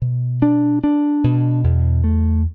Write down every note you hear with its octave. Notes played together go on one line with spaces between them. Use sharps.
B2
D4
D4
B2
E2
A3